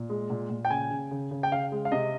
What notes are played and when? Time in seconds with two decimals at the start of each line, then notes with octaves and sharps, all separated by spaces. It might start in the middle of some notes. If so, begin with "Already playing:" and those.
Already playing: A#2
0.10 G#3
0.30 A#2
0.50 A#2
0.65 G5
0.70 C#3 G#5
0.90 C#3
1.11 C#3
1.31 C#3
1.43 G5
1.51 C#3 F5
1.72 G#3
1.85 F5
1.92 C3 D#5